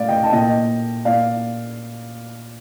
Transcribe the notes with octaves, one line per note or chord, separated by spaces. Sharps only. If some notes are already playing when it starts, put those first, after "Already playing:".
Already playing: A2 D5 F5
D#5 G5
A5
A#2 D#5 G5
A#2 D5 F5